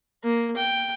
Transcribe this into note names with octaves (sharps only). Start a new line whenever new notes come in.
A#3
G5